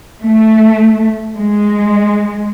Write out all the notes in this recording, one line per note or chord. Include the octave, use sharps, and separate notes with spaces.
A3
G#3